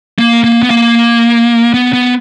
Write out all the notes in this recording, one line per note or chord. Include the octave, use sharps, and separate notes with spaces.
A#3
A#3
B3
A#3
B3
B3